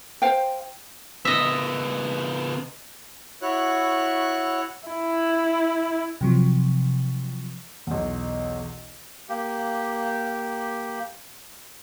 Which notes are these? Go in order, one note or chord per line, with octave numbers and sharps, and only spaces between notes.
C5 F5 G5
C#3 B3 D#5 E5
E4 F#4 C#5 F#6
E4
C3 F3 F#3
B1 E2
A#3 G4